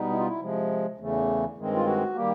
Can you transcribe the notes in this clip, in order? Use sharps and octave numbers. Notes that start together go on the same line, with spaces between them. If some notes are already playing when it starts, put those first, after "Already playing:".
Already playing: B2 G3 B3 D#4
E4
F4
E4
C3 F3 G#3
E2 C#3 E3 A3
G2 D#3 G#3 C4
F4
F#4
D#3 G3 A#3 G4